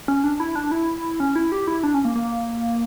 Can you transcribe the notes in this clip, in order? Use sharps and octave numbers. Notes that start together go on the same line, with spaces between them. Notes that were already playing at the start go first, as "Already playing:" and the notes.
C#4
D4
E4
D4
E4
C#4
E4
G4
E4
D4
C#4
A#3
A#3